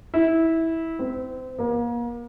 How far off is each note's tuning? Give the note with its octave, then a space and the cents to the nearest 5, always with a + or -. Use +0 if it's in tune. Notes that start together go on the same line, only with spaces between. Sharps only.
E4 -15
C4 -30
A#3 +35